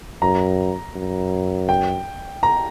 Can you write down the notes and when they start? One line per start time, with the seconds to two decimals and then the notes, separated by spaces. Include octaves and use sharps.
0.22 F#2 A#5
0.96 F#2
1.69 G5
2.43 A#5